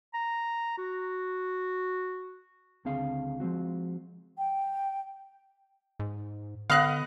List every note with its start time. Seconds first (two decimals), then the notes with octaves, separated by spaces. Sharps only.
0.14 A#5
0.78 F#4
2.85 C#2 D3 C4 G#4 F5
3.40 F3 G#3 C4 F#4
4.38 G5
6.00 G#2
6.70 D3 B3 D#5 F5 F#6